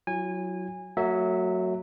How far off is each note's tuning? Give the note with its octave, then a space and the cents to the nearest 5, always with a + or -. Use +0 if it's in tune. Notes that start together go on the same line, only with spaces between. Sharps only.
F#3 +0 E4 +40 G#5 -20
F#3 +0 A3 +45 E5 -15